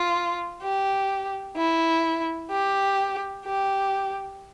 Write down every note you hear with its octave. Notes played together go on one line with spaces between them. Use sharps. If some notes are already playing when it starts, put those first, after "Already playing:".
Already playing: F4
G4
E4
G4
G4